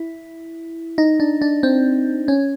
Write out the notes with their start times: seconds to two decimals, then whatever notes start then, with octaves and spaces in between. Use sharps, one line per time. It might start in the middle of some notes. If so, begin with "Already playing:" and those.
Already playing: E4
0.98 D#4
1.20 D4
1.42 D4
1.63 C4
2.28 C#4